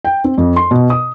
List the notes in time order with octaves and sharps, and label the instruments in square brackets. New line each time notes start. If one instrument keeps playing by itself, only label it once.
[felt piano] G5
C4
F2
C6
B2
D#6